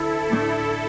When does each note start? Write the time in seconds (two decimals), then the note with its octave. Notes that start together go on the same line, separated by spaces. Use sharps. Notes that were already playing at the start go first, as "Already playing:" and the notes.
Already playing: D2 D3 A3 D4 E4 A4
0.31 A2 A3 D4